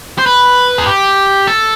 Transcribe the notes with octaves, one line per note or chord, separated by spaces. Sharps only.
C5
B4
G#4
G4
A4